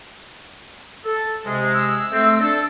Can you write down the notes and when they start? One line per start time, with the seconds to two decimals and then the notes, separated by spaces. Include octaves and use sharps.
1.05 A4
1.45 C3 G#3
1.74 E6
2.11 A3 C4
2.40 D4 A4